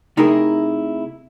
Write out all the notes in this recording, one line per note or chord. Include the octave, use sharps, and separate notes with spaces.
C3 A3 D#4 E4 G#4 A#4